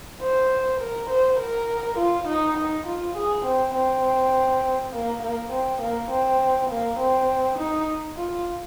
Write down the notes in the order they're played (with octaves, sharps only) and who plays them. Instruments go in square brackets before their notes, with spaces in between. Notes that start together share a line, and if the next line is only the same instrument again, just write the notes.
[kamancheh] C5
A#4
C5
A#4
F4
D#4
D#4
F4
G#4
C4
C4
A#3
A#3
C4
A#3
C4
A#3
C4
D#4
F4